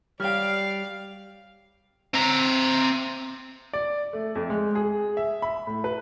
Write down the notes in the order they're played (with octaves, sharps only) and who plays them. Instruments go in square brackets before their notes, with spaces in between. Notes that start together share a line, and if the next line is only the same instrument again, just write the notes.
[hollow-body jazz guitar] G3 C#5 [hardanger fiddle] D5 F5 [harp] G5 F6
[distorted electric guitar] C4 A#5
[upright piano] D5
A3
F2
G#3
G#4
E5
B5
A2
B4